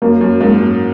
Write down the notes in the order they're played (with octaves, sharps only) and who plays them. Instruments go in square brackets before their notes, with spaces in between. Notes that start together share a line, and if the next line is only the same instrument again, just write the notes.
[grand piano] F#2 [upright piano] A#3
[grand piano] F#2
[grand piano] G#2 [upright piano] A#3
[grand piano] F#2